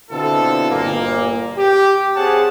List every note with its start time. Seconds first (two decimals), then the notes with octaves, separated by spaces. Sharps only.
0.11 B2 D3 C4 E4 F4 A4
0.70 G1 A#2 A#3
1.58 G4
2.16 C4 G4 G#4 C#5 F#5 A5